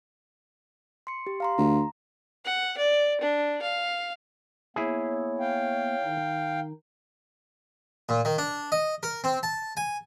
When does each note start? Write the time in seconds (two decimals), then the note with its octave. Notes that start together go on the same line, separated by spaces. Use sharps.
1.07 C6 C#7
1.27 G4
1.40 F5 A#5 C6
1.58 D2 A#5
2.45 F#5
2.78 D5
3.21 D4
3.62 F5
4.76 A#3 B3 E4 G#4 C#5
5.40 F5 G5
6.03 D#3 D#4
8.09 A#2
8.25 D#3
8.38 D4
8.72 D#5
9.03 A#4
9.24 C4
9.43 A5
9.77 G#5